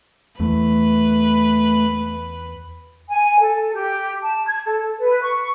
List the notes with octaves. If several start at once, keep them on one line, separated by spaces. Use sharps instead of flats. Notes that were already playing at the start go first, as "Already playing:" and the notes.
E2 A3 B4
G#5
A4
G4
A5
G#6
A4
B4
C#6